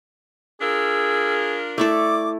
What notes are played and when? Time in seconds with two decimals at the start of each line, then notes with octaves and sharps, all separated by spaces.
0.61 D4 F4 G#4 A#4 E6
1.78 A3 E4 A4 D5 D6